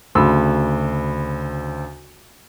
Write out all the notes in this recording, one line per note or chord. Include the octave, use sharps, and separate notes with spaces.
D2 C#3 B5 C6 E6